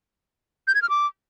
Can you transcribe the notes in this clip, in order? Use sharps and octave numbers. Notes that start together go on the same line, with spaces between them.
G6
G#6
F6
D6